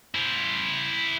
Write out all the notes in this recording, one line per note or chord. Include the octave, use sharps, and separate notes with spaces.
E4 C5